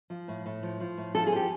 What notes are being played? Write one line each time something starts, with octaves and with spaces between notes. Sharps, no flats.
F3
A2
A2
F3
F3
A2
F3 A4
G#4
F3 G4